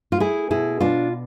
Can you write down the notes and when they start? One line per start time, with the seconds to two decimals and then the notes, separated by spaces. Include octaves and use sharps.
0.12 F4
0.20 A3 E4 G#4
0.51 B2 E4 G#4
0.80 B2 D4 F4